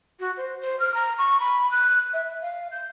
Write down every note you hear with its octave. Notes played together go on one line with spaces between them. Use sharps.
F#4
C5
C5
F6
A#5
C#6
B5
F#6
E5
F5
G6